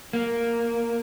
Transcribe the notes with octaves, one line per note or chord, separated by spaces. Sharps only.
A#3